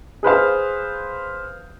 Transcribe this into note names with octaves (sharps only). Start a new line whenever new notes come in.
G#4 B4 C5 F5